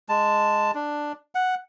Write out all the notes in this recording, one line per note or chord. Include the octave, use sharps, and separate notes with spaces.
G#3 A5
D4
F#5